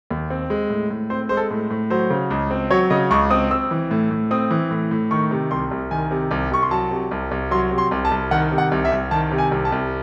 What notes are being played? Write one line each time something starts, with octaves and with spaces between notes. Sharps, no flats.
D#2
C4
G#3
A2
A2
C4 C5
G#3 C5
A4
A2
A2
F#3 C5
C#3
C#2
C4
F#3 C#5
C#3 D#5
C#2 C#6
C4 D#6
C4 E6
E3
A2
A2
C4 D#6
E3
A2
A2
D#3 C#6
C3
C2 C6
C2
D#3 G#5
C3
C2
C2 C#6
C6
F#3 A5
C3
C2
C2
F#3 C6
C3
C6
C2
A5
C2
D#3 F#5
C3
F#5
C2
E5
C2
D#3 A5
C3
G#5
C2
A5
C2